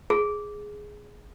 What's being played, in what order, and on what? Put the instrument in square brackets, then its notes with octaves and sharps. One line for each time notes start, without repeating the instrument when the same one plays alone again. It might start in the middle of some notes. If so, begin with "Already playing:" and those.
[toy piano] G#4